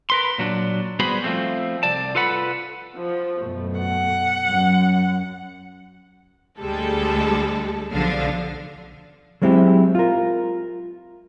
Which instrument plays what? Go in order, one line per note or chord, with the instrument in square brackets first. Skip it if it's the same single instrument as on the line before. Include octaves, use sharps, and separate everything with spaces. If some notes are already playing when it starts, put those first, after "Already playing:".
[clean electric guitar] A#4 B4 C6
A#2 F#3 D4
G3 B3 F#4 G#4 C5 B5
F3 A3 C4
C2 D5 A5
F4 A4 B4 F#5 B5
[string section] F3
F#2 B2 A3
[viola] F#5
[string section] F#2
D2 G3 G#3 A4
B1 D3 F3 D4 F5
[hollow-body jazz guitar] F#3 G#3 C4 E4 G4
F4 A#4